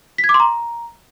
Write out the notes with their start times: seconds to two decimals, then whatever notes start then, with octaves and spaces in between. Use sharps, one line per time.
0.18 B6
0.24 G#6
0.29 D6
0.34 C6
0.40 A#5